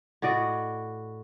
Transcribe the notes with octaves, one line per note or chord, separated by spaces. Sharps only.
A2 F#4 D5 D#5